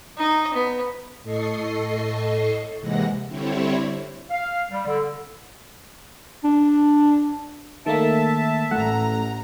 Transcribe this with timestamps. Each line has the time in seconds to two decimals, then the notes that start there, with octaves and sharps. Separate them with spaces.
0.17 D#4 D#5
0.54 B3
1.23 A2 A4 D#5 C#6 C7
2.81 D#2 C3 E3 G#3 F#5 A#6
3.27 D3 G3 C4 E4 C#5
4.31 F5
4.72 G3
4.87 D3
6.44 D4
7.86 D#3 A3 A#3 E5 A5
8.71 A1 A3 F#5 A#5